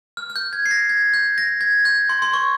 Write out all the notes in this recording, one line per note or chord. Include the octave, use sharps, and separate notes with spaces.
F6
F6
G6
G#6
C7
A#6
G#6
G6
A#6
G#6
G6
C6
C6
C#6